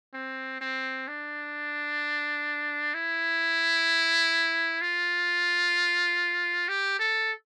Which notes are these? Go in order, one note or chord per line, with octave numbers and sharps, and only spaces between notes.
C4
C4
D4
E4
F4
G4
A4